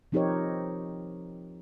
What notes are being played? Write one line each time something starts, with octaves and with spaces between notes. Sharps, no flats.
F3 C4 D#4 G4 A#4 C#5